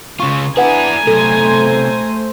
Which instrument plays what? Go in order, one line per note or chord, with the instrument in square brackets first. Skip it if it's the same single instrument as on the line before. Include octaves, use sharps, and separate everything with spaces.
[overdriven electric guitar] C#3 F4 [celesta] C#6
[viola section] D4 [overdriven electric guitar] E4 G#4 [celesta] B4 F#5 [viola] G#5 A#5
[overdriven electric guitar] B1 C3 [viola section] A3 C5 [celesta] A4